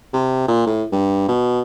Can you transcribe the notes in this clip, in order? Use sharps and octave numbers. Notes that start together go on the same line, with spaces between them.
C3
A#2
A2
G2
B2